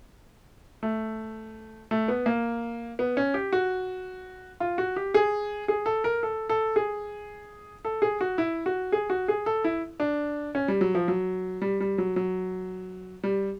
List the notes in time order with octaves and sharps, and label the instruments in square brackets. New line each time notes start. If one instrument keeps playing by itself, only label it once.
[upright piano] A3
A3
B3
A#3
B3
C#4
G4
F#4
F4
F#4
G4
G#4
G#4
A4
A#4
A4
A4
G#4
A4
G#4
F#4
E4
F#4
G#4
F#4
G#4
A4
E4
D4
C#4
G3
F#3
F3
F#3
G3
G3
F#3
F#3
G3